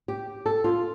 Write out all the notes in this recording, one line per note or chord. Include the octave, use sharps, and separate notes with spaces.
G4
A4
F4